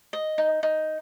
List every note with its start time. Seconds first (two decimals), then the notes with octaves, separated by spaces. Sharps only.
0.13 D#5
0.38 D#4
0.63 D#4